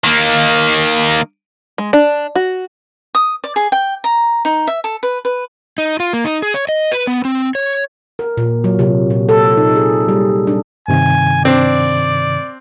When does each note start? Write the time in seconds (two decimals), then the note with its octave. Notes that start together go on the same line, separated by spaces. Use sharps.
0.04 D#3 A#3
1.78 G#3
1.93 D4
2.35 F#4
3.15 D#6
3.44 D5
3.56 G#4
3.72 G5
4.04 A#5
4.45 D#4
4.67 E5
4.84 A4
5.03 B4
5.25 B4
5.78 D#4
6.00 F4
6.13 A#3
6.25 D#4
6.42 G#4
6.54 C#5
6.69 D#5
6.91 B4
7.07 B3
7.25 C4
7.55 C#5
8.19 A#4
8.37 A#2
8.64 F#3
8.79 C3
9.10 A#2
9.29 A4
9.57 D#4
9.76 G#4
10.08 G3
10.47 D4
10.88 G2 C3 D#3 G#5
11.45 C4 D4 D5